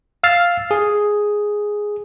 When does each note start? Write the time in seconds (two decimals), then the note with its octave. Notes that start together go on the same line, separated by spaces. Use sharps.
0.23 F5 E6 F6 A6 C7
0.71 G#4